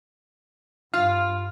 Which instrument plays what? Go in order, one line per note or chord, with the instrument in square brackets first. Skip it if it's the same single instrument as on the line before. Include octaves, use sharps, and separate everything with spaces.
[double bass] G2 [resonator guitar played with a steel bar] F4 [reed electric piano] F5 F6